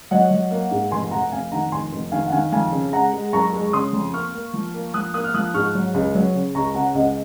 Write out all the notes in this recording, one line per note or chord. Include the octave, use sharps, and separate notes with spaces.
F#3 D#5 F#5
F#3
A#3
G#2
F1 G#5 C6
F1 F#5 A#5
F1 F5 G#5
D#3 F#5 A#5
F1 G#5 C6
F1
D#3 F5 G#5
F#5
D#3 F5 G#5
F2 F5 G#5
C#3
G#3 F#5 A#5
G#3
F#1 A#5 C#6
G#3
C#3 C6 D#6
F2
A#3 C#6 F6
A#3
F3
A#3
F3 D#6 F#6
A#3 D#6 F#6
F6
F3 D#6 F#6
G#2 C#6 F6
F#3
C#2
F#3
C#3
C#2 A#5 C#6
C#3 F#5 A#5
C#2 D#5 F#5